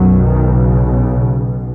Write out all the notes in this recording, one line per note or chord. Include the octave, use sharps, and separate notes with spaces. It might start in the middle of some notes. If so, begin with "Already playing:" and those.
Already playing: B1 F#2 B2 F#3
D#3
C#3
C#3